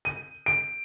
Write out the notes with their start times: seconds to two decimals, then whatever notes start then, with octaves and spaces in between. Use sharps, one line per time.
0.05 D#7
0.46 D7